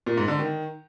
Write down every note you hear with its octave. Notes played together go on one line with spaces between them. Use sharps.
A#2
G#2
D3
D#3